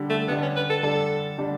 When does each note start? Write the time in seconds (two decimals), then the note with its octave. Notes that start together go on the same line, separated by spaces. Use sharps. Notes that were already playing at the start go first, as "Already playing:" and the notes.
Already playing: D3 G3 D4
0.10 A3
0.28 D3 G3 B3 D4
0.42 C#4
0.56 B4
0.70 A4
0.83 D3 G3 D4 A4
1.38 D3 G3 D4